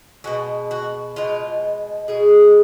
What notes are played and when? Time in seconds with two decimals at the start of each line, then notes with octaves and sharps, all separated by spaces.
0.24 B2 G#3 F#4
0.71 F#4
1.16 B2 G#3 F4
2.08 B2 G#3 G#4